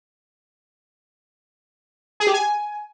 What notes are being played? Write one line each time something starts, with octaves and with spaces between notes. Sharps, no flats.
G#4
G4
G#5